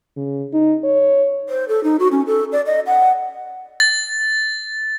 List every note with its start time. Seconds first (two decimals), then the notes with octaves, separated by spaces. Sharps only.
0.17 C#3
0.53 D#4
0.84 C#5
1.49 C5
1.68 A4
1.84 D#4
1.99 F#4
2.11 C#4
2.26 A4
2.52 D5
2.66 D#5
2.87 F#5
3.80 A6